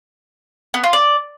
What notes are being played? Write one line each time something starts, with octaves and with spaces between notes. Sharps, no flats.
B3
F4
D5